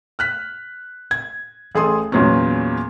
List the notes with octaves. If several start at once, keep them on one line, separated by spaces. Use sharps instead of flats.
F6 F#6 B6
G#6
A1 G#4 A4 C6 D#6
E2 A#2 F#3 B3 C#4